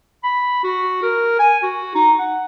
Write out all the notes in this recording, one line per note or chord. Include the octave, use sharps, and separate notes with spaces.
B5
F#4
A#4
G#5
F#4
D#4
F#5